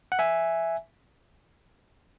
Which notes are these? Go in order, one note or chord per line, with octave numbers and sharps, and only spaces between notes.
F#5
E5 G#5